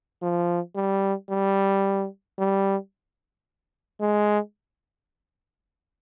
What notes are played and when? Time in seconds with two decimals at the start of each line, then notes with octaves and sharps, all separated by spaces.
0.22 F3
0.76 G3
1.30 G3
2.38 G3
4.01 G#3